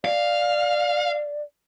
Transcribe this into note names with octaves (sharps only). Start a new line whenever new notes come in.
D5 F5